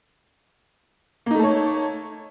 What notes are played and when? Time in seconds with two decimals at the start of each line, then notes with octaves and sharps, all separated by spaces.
1.26 A#3
1.31 D#4
1.35 A3
1.39 A4
1.44 C#5